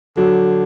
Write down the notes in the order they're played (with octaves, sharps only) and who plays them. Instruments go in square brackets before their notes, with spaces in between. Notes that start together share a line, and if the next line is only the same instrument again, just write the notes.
[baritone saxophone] D3 [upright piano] F#3